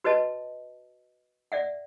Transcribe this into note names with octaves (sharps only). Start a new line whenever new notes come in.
F#4 B4 C#5 D#5 A5
D5 E5 F#5